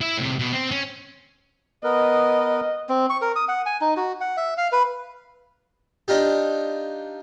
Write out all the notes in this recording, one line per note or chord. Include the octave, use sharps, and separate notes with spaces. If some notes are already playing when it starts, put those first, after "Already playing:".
E4 E5
A2 C3
B2
C4
C#4
B3 A#4 B4 D#5
C4
C#6
A#4
D#6
F#5
G#5
D#4
F#4
F#5
E5
F5
B4
D4 D#4 F4 G4